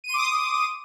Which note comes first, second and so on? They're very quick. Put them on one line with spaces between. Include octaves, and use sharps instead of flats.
D#7 C6 D6 D#6